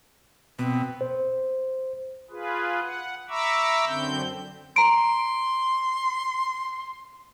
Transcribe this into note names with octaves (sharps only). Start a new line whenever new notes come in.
B2 C4
C5
F4 G#4 B4
F#5
E5 A#5 B5 C#6 D6 E6
F#2 D3 C4 G6
A#5 C6 D7